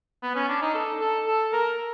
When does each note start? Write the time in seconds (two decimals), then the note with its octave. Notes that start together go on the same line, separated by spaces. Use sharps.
0.23 B3
0.36 C#4
0.49 D4
0.62 D#4
0.75 A4
1.00 A4
1.27 A4
1.53 A#4